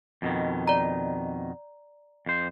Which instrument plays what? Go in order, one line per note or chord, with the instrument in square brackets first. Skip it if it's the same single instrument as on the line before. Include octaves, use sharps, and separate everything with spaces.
[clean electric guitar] F2 B2 D#3
[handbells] D5 A#5
[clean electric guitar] F2 C5